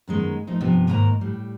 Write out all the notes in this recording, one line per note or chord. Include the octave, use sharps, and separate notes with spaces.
F#2 D#3 G#3 B3
A#2 F3 A3 D#4
G2 C3 F3 B3
D#2 G#2 D#3 A#3 A5 A#5
A2 G3